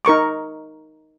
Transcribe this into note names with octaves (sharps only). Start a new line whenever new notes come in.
D#4 A#4 C#6 D6